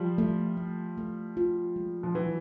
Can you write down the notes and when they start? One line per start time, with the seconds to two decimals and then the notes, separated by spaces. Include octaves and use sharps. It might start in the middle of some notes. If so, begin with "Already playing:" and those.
Already playing: F3 G3
0.18 A3
0.57 A3
0.98 A3
1.37 F4
1.76 G#3
2.03 F3
2.14 E3 F#3 F#4